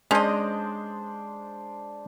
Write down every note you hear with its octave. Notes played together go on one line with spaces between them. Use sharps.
G#3 C#4 D4 C5 D5 D#5